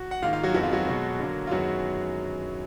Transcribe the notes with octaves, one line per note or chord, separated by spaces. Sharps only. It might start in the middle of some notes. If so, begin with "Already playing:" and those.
Already playing: F#4
F#5
G#2 D#3 A#3 F4 F5
F4 F5
F#3 F#4
F2 D#3 G#3 B3 F#4
F4
F#3 F#4
B2 G#3 B3
D3 F#3 A#3
F4
F#2 D#3 F#3 G#3 B3 F#4